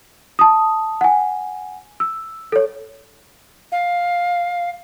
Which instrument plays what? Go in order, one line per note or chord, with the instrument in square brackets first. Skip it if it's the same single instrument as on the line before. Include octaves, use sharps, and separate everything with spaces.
[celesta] A5 D#6
F#5 G#5
E6
A4 C#5
[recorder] F5